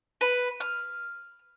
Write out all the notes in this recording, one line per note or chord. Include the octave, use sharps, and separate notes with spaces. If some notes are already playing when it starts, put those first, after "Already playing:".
B4
F6